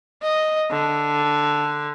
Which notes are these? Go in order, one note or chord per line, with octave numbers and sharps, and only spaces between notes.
D#5
D3